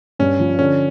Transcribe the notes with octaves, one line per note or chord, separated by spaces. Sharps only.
G2 C#4
F3
D3 C#4